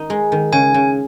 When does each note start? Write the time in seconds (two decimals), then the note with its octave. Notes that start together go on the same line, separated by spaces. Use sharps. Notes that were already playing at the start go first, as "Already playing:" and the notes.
Already playing: D#3 D#4
0.10 G#3
0.32 D#3
0.52 C#3 G#5
0.74 C#3